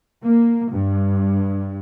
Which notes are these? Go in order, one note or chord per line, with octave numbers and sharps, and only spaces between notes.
A#3
G2